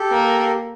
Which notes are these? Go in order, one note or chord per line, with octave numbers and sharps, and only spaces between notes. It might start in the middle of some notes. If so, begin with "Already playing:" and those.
Already playing: G4 A4
A#3